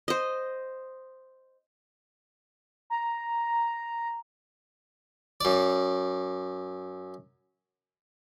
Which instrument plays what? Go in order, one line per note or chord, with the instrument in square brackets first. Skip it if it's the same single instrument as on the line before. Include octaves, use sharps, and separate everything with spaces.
[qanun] C5 D#5
[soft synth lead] A#5
[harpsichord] F#2 D5